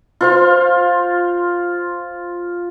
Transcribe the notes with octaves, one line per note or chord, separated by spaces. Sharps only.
F4 C5 F5